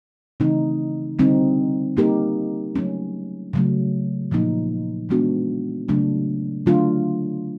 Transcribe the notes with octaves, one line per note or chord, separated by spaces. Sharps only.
C#3 E3 A3 C4 D#4
D3 G3 C4 D#4
G3 A#3 D#4 G4 A#4
F#3 A3 C#4
C#3 F#3 A3
A#2 F3 A#3 D#4
E3 G#3 B3 D4 F#4
C#3 F#3 A3 D4
D3 F#3 A3 D4 F4